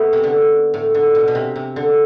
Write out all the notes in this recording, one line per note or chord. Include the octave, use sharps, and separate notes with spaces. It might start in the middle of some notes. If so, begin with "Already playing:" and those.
Already playing: A3 B3
C3
D3
A2
D3
B2
B2
C3
C3
D3